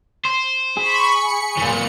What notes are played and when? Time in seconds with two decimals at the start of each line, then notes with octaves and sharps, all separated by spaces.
0.25 C5
0.77 G#4 B5 C#6
1.07 C#7
1.57 A#2 E3